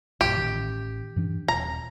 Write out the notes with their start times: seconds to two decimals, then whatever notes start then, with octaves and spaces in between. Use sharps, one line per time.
0.21 A#1 G2 G4
0.36 A1 D#3
1.16 G2 E3 D4
1.48 D#1 A#5